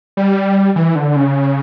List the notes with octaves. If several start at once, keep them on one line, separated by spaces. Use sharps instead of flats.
G3
E3
D3
C#3